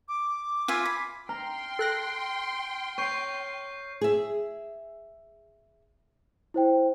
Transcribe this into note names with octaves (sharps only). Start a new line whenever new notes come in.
D6
F4 E5 G#5
B5
G5 A#5 C6 F6 C7
A4 F#6 A#6
C#5 C#6 G6 C7
G#4 E5
E4 C5 G5